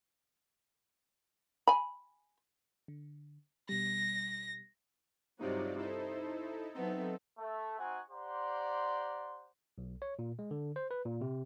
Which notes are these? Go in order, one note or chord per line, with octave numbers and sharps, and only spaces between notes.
G#5 B5
D3
B2 G3 A#6
G2 C3 F#3 D#4 F4 D5
D#4 E4 A4 C5
F#3 B3 C4 D#4 A4 E5
A3
C4 D#4 F#4 F#5 G#5
G4 C5 D5 F#5 A#5 C6
B1
C#5
A#2
G#3
D3
C5
B4
A#2
C3